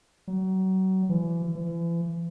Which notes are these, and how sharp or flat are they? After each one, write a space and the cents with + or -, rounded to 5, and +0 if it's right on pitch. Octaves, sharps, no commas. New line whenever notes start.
F#3 +30
E3 +35
E3 +40